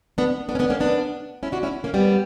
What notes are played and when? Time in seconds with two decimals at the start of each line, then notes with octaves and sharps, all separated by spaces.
0.18 B3 D4
0.49 B3 D4
0.55 C#4
0.59 B3 D4
0.70 A#3 C#4
0.80 B3 D4
1.43 C#4 E4
1.52 D4 F#4
1.63 C#4 E4
1.84 A#3 C#4
1.94 G3 B3